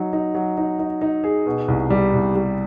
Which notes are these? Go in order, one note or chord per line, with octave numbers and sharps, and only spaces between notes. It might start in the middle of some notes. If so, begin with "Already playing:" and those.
Already playing: F#3 D#4
D#4
F#3
D#4
D#4
D#4
G#4
B2
C2
G3
C2
G3